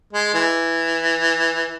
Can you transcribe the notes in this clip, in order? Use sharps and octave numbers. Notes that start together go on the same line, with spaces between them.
G#3
E3